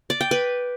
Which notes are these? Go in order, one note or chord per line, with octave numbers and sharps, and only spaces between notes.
D5
G5
B4